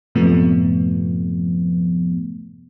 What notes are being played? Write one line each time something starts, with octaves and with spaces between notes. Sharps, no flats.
F#2 A2 C3 F3 A3 B3